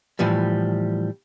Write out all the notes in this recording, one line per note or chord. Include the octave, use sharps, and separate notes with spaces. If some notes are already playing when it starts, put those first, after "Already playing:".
A2 E3 F3 G3